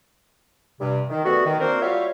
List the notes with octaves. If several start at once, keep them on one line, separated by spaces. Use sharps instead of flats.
G2 C3
D#3
G3 A3 B3 F#4
D#3
A#3 C4 D4 F#4 A#4 C5
G3 F4 F#4 C#5 E5 F5